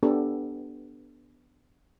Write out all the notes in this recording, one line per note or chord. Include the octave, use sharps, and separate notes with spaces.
B3 D4 G4 A4